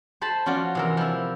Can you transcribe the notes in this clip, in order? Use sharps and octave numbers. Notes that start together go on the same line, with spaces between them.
C5 A5 B5
F3 C#4 F4 F#4 D5
C3 E3 A#4
F3 E4